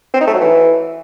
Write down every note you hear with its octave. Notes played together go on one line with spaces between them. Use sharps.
C4
D#4
A3
F#3
E3